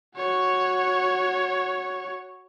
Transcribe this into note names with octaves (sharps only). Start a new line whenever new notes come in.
F#4 C#5